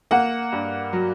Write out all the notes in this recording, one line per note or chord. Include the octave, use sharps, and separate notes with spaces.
A#3 F#5
G2
F#3